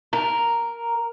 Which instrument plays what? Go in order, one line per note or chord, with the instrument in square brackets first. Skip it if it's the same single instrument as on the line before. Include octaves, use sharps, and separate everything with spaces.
[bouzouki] A#4